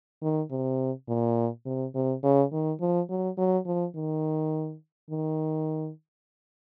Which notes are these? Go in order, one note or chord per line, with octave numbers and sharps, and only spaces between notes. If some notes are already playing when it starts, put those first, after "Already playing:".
D#3
C3
A#2
C3
C3
C#3
D#3
F3
F#3
F#3
F3
D#3
D#3